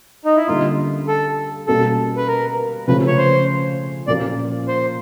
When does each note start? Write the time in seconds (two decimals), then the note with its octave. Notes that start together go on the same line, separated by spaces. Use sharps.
0.25 D#4
0.36 E4
0.47 D3 G3 A#3 C#4 F4
1.08 A4
1.67 B2 G3 A#3 C#4 F#4 A4
2.17 B4
2.28 A#4
2.88 C#3 F3 A3 C#4 B4
3.07 C#5
3.17 C5
4.07 A#2 F3 A#3 C#4 D5
4.68 C5